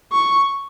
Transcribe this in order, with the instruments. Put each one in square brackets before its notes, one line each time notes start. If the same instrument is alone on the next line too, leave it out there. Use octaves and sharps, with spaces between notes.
[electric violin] C#6